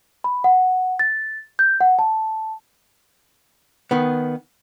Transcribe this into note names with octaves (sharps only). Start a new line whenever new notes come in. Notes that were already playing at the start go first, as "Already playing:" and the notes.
B5
F#5
A6
G6
F#5
A5
D#3 B3